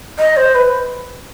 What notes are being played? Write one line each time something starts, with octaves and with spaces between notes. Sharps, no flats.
D#5
C5
B4